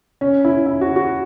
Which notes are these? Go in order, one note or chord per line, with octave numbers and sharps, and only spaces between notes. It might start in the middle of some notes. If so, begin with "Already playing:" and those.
C#4
E4
E4
F#4
F#4